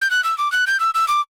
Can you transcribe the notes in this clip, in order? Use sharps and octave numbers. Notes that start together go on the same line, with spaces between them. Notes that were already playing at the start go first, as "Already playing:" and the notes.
G6
F#6
E6
D6
F#6
G6
E6
E6
D6